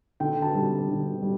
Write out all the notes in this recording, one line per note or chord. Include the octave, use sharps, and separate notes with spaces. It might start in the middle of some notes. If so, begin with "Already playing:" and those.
D3 G5
A5
G3
D3
G3